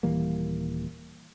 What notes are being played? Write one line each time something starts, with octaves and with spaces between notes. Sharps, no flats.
D#1 E3 G3 A#3